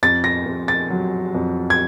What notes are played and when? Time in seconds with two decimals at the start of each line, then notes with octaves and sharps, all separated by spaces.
0.03 F2 A6
0.24 A#6
0.46 F2
0.68 A6
0.90 F#3
1.34 F2
1.70 G#6